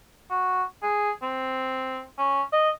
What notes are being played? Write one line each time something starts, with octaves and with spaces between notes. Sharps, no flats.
F#4
G#4
C4
C#4
D#5